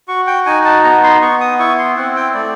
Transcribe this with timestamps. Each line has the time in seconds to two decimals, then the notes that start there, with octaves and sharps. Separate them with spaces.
0.08 F#4 C#6
0.27 G5
0.46 D#4 G#5
0.65 A5
0.84 B3 A#5
1.03 C6
1.22 B3 C#6
1.41 D#6
1.59 E4 C#6
1.79 C6
1.97 C4 F#5
2.16 G5
2.34 A3 D5